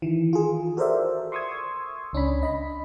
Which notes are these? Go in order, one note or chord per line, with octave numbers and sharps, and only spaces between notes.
D#3 E3
F4 G#4
F#4 A4 A#4 C5 D5 E5
C6 C#6 D#6 E6 G#6
C#2 C#4 D4 B5
D#5 B5